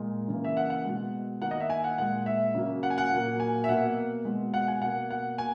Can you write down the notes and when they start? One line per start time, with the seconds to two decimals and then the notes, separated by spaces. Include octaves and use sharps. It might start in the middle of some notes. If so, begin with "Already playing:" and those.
Already playing: A#2 G#3
0.28 C#3 E3 A#3
0.44 E5
0.57 F#5
0.70 F#5
0.85 B2 G#3
1.41 D#3 A#3 F#5
1.51 D#5
1.60 E5
1.70 G#5
1.84 F#5
1.98 A#2 G#3 F#5
2.26 E5
2.55 C#3 F#3 A#3
2.83 F#5
2.90 G#5
2.98 F#5
3.12 A#2 F#3 A#3
3.40 G#5
3.64 E5
3.69 B2 A#3 F#5
4.25 B2 G#3
4.54 F#5
4.68 G#5
4.82 B2 A#3 F#5
5.10 F#5
5.38 A#3 G#5